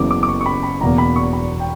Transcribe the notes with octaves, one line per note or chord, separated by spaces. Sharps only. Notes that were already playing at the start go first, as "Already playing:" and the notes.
Already playing: F#1 F#2 C#3 E3 B3 D6
D6
D6
C#6
C#6
B5
B5
E1 E2 B2 A#3 A#5
B5
C#6
B5
G5